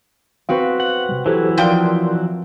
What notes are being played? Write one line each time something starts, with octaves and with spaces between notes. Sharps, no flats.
C4 F#4 B4 F5
F#5
C3 G3
E3 F#3 E4 G4 A4 C5
F3 A#4 D5 G5 C6